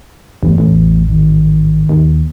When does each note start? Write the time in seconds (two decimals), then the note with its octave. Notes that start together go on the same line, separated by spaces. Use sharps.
0.43 G1 E2 E3 A3
0.58 A1
1.08 G#2 D#3
1.89 D#2